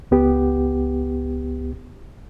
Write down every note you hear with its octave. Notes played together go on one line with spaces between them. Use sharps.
C#2 B3 G4